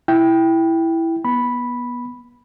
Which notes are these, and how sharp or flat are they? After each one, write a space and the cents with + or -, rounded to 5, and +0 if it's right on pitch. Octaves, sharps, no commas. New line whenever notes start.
E4 +0 G5 +0
B3 -25 B5 -5